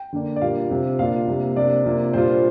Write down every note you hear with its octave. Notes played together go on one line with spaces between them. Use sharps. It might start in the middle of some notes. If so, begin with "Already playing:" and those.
Already playing: G5
D3 A#3 D4
D5
A#2 G3 A#3 D4 F4 F5
C3 G3 C4 F4
A#2 A#3 D4 F4 F5
C3 G3 A#3
C3 A#3 D4 D5
C3 A#3 F4
A#2 G3 D4 F4 C5